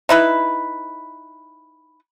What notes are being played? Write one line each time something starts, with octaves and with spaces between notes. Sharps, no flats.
D#4 E4 B4